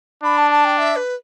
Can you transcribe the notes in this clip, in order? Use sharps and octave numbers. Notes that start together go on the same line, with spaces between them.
D4 B5
A5
A5
G5
E5
B4